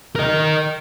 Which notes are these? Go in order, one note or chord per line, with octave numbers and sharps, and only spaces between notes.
A#4 D#5